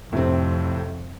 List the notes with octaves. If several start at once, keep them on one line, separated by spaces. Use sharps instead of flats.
F2 A2 C3 C4